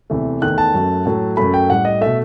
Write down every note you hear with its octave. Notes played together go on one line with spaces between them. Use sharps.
E2 C3 E3 A3
E2 D#3 A3 F#6
A5
F#2 F#3 A3
A2 F#3 A3
F#2 F#3 A3 B5
G5
A2 G3 F#5
D#5
B2 A3 E5